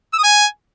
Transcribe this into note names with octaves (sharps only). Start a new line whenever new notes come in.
E6
D#6
G#5